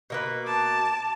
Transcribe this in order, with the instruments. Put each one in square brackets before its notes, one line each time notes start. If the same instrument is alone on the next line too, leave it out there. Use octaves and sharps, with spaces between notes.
[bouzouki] B2 A#3 B4
[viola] A5 D6